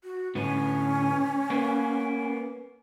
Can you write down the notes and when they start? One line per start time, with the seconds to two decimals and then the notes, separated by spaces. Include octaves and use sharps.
0.03 F#4
0.35 A2 D3 B3 C#4
1.50 A#3 B3